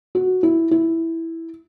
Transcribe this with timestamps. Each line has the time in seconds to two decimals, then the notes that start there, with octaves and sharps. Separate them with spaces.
0.15 F#4
0.43 E4
0.71 E4